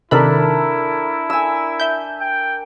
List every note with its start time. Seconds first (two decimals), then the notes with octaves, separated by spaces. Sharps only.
0.11 C3 D#3 D4 E4 A4 A#4 B5
1.30 G#5 E6
1.80 E5 G6
2.21 G5